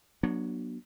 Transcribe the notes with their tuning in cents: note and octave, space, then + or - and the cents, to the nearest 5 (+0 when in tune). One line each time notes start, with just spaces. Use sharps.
F#3 +0 B3 -40 D4 +20